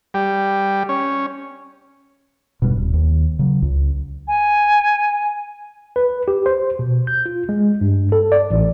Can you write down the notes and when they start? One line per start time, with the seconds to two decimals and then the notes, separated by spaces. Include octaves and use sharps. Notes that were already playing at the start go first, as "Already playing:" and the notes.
0.14 G3
0.89 C#4
2.62 D#1 G2 B2
2.75 D#1
2.94 D#2
3.39 C#3 F#3
3.62 C#2
4.28 G#5
5.96 B4
6.28 G4
6.46 C5
6.79 B2
7.07 G6
7.26 F4
7.49 G#3
7.81 G2
8.12 A4
8.32 D5
8.51 A1